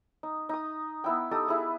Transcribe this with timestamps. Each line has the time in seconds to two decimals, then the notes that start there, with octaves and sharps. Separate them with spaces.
0.23 D#4
0.49 D#4 D#6
1.04 B3 E4 G5
1.31 D#4 G4 A4 D#6
1.48 E4 G#4